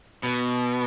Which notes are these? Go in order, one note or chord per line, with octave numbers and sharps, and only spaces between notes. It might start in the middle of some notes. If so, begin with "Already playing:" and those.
B2